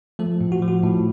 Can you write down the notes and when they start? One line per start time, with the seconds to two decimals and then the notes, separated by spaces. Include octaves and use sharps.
0.19 F3 A3 A4
0.41 A2
0.52 F#4
0.62 F3
0.68 F#4
0.83 A2